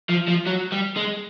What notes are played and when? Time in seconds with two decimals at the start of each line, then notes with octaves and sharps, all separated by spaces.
0.09 F3
0.28 F3
0.46 F#3
0.72 G3
0.97 G#3